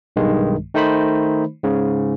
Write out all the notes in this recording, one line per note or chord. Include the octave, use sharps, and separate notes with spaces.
B1 G2 D#3 G#3
D#3 A3 D#4 C5 B5
G#2 C#3